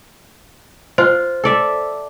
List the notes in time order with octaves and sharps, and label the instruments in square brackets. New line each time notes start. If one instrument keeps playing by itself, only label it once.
[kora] F4 [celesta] C5
[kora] A4 D5 E5